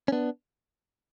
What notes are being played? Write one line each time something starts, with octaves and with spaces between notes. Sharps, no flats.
C#4
B3 D4